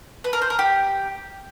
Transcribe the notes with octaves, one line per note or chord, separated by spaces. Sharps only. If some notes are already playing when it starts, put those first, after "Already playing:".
B4
A#4
C5
A#4
G4